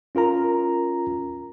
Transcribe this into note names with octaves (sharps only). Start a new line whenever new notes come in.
C#4 F4 A#4 A#5